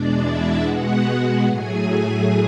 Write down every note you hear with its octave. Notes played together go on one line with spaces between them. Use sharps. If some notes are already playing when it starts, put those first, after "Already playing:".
Already playing: E2 B2 G#3 D4 D5
E4 E5
B2 G#3 B3 F#4 F#5
A2 F#3 A3 G#4 G#5